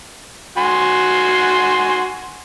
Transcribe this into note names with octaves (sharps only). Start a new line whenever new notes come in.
F#4 G#5 C6